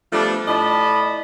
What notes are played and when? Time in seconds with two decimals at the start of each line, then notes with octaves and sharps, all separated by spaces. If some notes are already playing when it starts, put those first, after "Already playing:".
0.12 F3 G3 A3 B3 D4
0.47 A2 D5 D#5 A5 B5